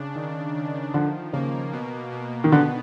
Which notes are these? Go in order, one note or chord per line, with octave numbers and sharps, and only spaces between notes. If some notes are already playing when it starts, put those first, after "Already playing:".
Already playing: C#3 D4
D#3
D#3
D3 F3
C#3 A#3
B2
B2
D#3
D3 B3